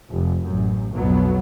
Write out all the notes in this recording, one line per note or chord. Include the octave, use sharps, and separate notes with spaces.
F1
A1 F#2
B1 F2 G#2 B2 F#3 B3